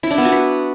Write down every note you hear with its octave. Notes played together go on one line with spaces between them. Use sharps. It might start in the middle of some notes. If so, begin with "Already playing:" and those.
E4
D4
B3
F#4
B4